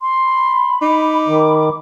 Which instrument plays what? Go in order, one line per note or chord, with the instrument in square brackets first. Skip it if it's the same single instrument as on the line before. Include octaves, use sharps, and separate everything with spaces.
[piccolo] C6
[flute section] B5
[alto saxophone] D#4 [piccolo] D6
[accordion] D#3